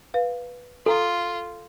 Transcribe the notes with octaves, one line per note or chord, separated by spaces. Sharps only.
B4 F5
F4 A4 G#5 A#5